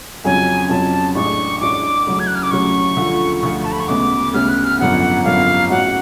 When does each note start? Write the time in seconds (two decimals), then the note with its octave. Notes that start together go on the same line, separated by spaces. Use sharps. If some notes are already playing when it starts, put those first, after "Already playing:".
0.24 F2 C#3 F#3 C#4 G#5
0.69 F2 C#3 F#3 C#4 A5
1.15 A1 A2 G#3 D4 G#4 C#6
1.61 A1 A2 G#3 D4 G#4 D6
2.06 D2 C#3 F#3 C#4
2.19 G#6
2.27 F#6
2.35 F6
2.43 D6
2.51 D2 C#3 F#3 C#4 C#6
2.96 D2 D3 F3 A3 F4
3.42 D2 D3 F3 A3 F4 C#6
3.64 A5
3.72 B5
3.80 C#6
3.88 D2 C#3 G#3 B3 D6
4.33 D2 C#3 G#3 B3 F6
4.49 F#6
4.64 F6
4.79 G#1 F#2 D3 F3 B3 F#5
5.24 G#1 F#2 D3 F3 B3 F5
5.70 A1 G#2 G#3 C#4 F#4 F#5